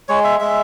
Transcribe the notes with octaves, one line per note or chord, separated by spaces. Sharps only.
G#3 C#5
E5
G#3 E5